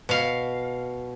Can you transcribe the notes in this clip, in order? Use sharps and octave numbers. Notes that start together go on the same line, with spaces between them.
B2 F5